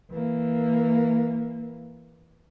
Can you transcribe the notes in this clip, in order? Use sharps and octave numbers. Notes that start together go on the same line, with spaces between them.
E3 A#3